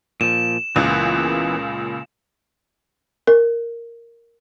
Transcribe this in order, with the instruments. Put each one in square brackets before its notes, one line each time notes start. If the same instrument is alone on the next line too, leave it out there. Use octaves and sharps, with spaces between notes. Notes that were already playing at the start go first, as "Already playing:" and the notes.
[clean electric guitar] A#2 F3 [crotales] E7
[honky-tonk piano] C#2 A#2 C#3 [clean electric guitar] E3 A#3 B3
[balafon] A#4